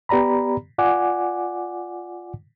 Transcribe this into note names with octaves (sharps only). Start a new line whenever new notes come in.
B3 G4 D5 A#5 B5
F4 D5 F#5 G#5 D6